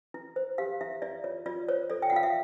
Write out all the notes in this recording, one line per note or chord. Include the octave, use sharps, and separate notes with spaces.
E4
C5
G4 F5
E4 E5
E4 D5
F4 C#5
F4 D5
C5 C#5
A4 D5
G5
F#5
F4 F5
E5